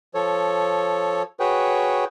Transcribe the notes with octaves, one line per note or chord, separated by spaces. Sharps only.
F3 A4 C#5
F#4 G#4 B4 C#5 G5